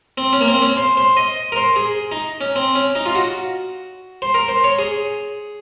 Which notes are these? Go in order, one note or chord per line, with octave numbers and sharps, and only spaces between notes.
C4
C#4
A#3
C4
C#4
C5
C5
D#5
A#4
C5
G#4
D#4
C#4
C4
C#4
D#4
F4
F#4
C5
A#4
C5
C#5
G#4